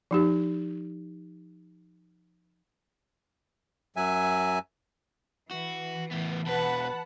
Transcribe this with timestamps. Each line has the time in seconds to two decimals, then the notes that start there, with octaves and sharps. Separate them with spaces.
0.11 F3 D#4 G4
3.96 F#2 F#3 E5 G#5
5.51 E3 F#4
6.11 A2 B3
6.46 E2 B2 B4 F#5 A5 B5